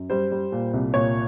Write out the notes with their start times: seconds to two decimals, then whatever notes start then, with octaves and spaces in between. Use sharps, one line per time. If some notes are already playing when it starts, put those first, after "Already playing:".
Already playing: F#2
0.10 G3 C5
0.32 G3
0.52 A#2
0.74 C2
0.94 A#2 C#5